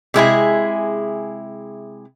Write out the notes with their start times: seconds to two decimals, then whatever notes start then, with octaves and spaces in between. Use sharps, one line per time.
0.14 C3 G#3 E4 G#4